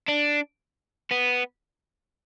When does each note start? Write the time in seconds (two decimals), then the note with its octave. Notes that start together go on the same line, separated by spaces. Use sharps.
0.08 D4
1.11 B3